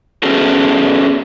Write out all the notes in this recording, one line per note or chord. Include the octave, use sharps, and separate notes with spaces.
A3 B3 C#4 F#4 G#4 A4